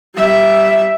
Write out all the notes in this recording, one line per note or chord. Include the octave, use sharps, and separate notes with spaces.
G3 E5